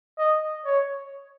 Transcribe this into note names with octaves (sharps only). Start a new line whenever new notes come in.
D#5
C#5